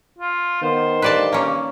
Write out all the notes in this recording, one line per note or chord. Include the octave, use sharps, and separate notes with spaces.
F4
D#3 B3 C5
G2 B4 D5 A5
A#3 C#4